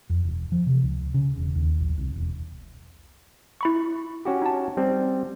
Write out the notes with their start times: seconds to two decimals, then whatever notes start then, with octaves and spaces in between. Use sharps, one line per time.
0.10 F2
0.25 E1
0.52 F3
0.67 C3
0.83 C#2
1.14 C#3
1.37 E1
1.55 D#2
1.80 A#1
1.97 C2
2.16 E1
3.61 E4 B5 C#6
4.25 C#4 F#4 G4
4.42 D#4 A5
4.77 G3 C4